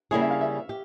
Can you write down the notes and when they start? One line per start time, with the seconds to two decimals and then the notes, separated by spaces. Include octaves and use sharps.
0.11 C#3 G3 A#3 E4 G#4 C#5
0.21 E5
0.30 F5
0.41 E5
0.69 G4